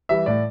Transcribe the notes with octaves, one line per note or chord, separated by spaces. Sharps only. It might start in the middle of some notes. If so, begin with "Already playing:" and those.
E3 G3 E5
A2 D5